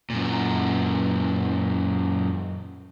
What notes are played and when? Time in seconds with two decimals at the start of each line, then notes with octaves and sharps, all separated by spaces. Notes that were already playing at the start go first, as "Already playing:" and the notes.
0.10 F#2 A#2